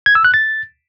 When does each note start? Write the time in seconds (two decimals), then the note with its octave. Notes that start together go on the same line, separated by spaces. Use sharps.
0.06 G#6
0.15 E6
0.25 F#6
0.34 A6